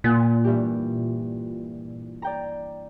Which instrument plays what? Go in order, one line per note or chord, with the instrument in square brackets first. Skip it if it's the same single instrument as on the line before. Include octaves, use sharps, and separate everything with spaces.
[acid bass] A#2 [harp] A#3 F#5 G#5
[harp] G2 E3 G4
D5 G5 A#5